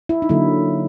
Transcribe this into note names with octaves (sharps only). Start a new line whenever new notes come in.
E4
D#4
D3 F#3 A#3 E4